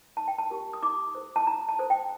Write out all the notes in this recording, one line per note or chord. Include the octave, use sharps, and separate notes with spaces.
D#4 A5
G5
A5
G4 A#4
D#6
D#4 D6
A4 C5
A5
D#4 A#5
A5
A4 C5
G5